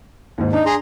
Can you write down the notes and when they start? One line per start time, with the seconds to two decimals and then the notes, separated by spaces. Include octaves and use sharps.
0.38 D#2 G#2
0.53 D4 D#4
0.66 G#4 A#5 C6